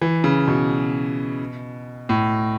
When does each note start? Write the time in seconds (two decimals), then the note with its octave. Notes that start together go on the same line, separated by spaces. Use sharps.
0.02 E3
0.24 C#3
0.48 B2
2.09 A2